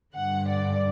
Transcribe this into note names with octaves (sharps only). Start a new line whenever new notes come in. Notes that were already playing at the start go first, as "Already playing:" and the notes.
G2 D3 F#5
D5